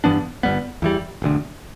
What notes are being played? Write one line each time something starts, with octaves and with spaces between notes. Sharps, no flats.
G2 E3 B3 D4
G1 G2 G3 B3
E2 E3 G3
E1 D2 D3